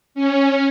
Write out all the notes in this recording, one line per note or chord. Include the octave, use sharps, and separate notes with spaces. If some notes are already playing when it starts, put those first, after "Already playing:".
C#4